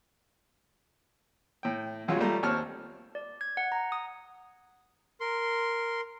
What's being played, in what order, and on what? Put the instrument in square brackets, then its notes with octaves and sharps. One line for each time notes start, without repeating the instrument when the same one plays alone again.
[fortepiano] A2 G5
B1 F#2 F#3 G#3 F4
G3 A3 F4 A#5
D#2 C4 C#5 A5 F6
[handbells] D5
G#6
F#5
A#5
D#6
[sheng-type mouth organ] A#4 C6